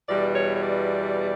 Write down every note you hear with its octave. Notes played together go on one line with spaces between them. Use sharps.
E2 B2 G3 D5
C#5
C#5
D5